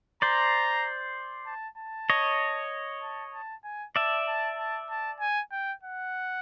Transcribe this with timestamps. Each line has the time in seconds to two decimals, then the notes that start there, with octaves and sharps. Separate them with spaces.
0.22 C5 D5 A#5
1.46 A5
1.78 A5
2.10 C#5 D#5
3.02 A5
3.33 A5
3.64 G#5
3.95 D5 E5 A5
4.27 A5
4.58 A5
4.90 A5
5.20 G#5
5.52 G5
5.83 F#5